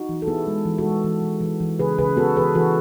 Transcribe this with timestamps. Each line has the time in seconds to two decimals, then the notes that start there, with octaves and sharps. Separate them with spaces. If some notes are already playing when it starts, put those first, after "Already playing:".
Already playing: D#4 F#4
0.09 E3
0.22 A4
0.27 B3 E4 G#4
0.47 G#3
0.65 E3
0.78 F#4 A4
0.85 G#3
1.04 E3
1.22 E3
1.41 E3
1.60 E3
1.79 C#3 G#4 B4
1.98 C#3 G#4 B4
2.17 B3 F#4 A4
2.36 E3 G#4 B4
2.55 E3 F#4 A4